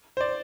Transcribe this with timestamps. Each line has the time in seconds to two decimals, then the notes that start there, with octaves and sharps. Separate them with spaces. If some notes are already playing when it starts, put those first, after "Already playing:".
0.17 C5
0.21 D5